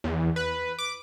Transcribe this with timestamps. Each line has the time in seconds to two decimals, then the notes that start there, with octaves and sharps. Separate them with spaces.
0.04 E2
0.36 B4
0.79 D6